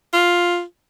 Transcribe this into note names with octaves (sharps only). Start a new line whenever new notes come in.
F4